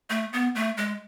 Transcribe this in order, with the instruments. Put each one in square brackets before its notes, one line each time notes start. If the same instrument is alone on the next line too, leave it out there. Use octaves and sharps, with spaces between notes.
[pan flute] A3
B3
A3
G#3